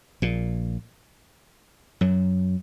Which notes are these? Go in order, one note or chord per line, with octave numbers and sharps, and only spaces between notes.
A#1 A#2
F#2 F#3